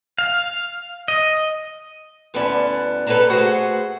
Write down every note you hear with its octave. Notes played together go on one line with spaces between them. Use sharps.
F5
D#5
D2 B3 C#4 E4 D5 A5
A4 B4 C#5 D5 A5 A#5
A3 F#4 G#4 B4 C5 F#5